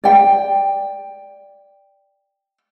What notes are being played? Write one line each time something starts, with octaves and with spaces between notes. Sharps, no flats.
D5 G5